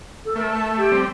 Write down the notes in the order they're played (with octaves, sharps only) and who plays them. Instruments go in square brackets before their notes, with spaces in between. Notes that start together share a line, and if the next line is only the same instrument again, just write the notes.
[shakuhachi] A4
[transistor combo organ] A3 [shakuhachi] A#4
[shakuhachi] A5
G4
[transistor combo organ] G3 C4